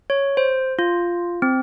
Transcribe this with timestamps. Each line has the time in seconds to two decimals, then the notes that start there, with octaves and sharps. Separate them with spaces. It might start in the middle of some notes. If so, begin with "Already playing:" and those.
0.10 C#5
0.37 C5
0.79 F4
1.42 C4